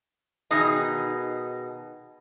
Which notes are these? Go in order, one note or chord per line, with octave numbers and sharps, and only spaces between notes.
B2 D#3 D#4 G#4 D#5